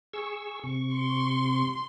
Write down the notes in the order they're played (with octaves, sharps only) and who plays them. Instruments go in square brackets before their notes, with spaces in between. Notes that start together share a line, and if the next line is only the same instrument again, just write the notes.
[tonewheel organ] G#4 C#6 E6
C3 C#6
[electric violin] C6